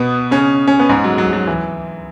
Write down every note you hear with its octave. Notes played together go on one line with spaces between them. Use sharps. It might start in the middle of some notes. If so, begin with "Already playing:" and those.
Already playing: B2 B3
C#3 C#4
C#4
B3
G#2 G#3
F#3
F#3
F#3
E3